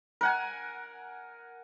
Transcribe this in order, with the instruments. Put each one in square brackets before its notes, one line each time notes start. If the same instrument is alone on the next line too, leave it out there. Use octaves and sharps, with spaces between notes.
[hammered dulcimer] A#4 F#5 G#5